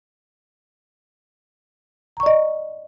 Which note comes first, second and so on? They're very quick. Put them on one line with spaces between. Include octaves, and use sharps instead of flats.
A#5 C#6 D5 D#5